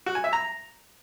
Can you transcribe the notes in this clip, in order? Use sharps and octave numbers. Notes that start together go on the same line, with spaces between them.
F#4
G#5
E5
A#5